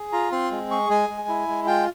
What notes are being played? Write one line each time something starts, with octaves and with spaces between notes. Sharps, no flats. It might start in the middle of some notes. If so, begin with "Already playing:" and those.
Already playing: G#4
F4 A#5
C4 C6
G#3
G#4 C#6
G#3 G#5
G#3
E4
G#3
F4 G5